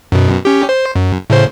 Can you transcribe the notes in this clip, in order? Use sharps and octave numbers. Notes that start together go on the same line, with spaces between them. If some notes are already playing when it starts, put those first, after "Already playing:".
F#2 B2
C#4 G4
C5
F#2
A2 C#3 C5